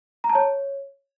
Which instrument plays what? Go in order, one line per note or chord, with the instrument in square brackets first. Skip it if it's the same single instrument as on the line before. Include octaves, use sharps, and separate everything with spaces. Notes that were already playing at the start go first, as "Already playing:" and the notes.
[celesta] A#5
A5
C#5